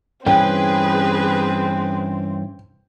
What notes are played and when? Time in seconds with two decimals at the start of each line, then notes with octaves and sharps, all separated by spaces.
0.27 G2 E3 C4 C#4 G#4 B4 G5